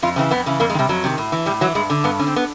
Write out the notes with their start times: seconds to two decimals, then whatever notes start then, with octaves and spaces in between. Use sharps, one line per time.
0.02 F2 F4
0.16 C#3 C4
0.19 E3
0.31 F2 B3
0.46 C#3 E3
0.60 F2 A#3
0.70 G#3
0.75 D#3
0.79 C3 G3
0.89 F2 F#3
1.04 C3 D#3
1.18 A2
1.32 E3
1.46 A2 G3
1.61 E3 F#3
1.75 G2 G#3
1.90 D3
2.04 G2 B3
2.19 D3 C#4
2.27 C4
2.36 B3